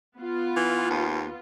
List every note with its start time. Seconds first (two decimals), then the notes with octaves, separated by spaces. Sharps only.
0.17 B3 F4
0.56 E3
0.90 D#2